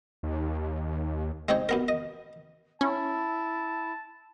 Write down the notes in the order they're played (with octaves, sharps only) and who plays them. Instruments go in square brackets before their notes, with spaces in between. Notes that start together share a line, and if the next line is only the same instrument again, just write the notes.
[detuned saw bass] D#2
[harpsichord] G#3 C4 D#4 C#5
F#2 B3 A#4
D#5
[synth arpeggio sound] C#4 [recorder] E4 [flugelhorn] A5